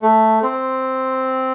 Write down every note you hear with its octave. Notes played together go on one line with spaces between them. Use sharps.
A3
C4